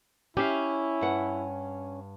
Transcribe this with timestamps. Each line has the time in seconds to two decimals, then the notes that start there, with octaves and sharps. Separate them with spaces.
0.37 C#4 E4 G4 E5 F5
1.01 G2 F#5